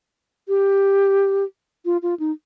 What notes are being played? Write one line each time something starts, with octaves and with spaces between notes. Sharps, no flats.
G4
F4
F4
D#4